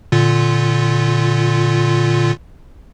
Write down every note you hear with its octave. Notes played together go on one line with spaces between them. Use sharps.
A#2 D3 F4